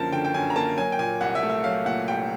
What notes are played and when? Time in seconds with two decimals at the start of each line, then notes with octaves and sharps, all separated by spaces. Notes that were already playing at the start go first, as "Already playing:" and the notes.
Already playing: F#2 D3 F3 A#3 A5
0.12 D3 G5
0.25 G5
0.34 F#2 G#5
0.50 A#5
0.56 A#3 A5
0.77 F#3 G#5
0.92 G5
0.99 A#2 G#5
1.21 C2 F#5
1.35 E5
1.43 A3
1.49 E5
1.64 F#3 F5
1.85 A#2 F#5
2.08 C2 G5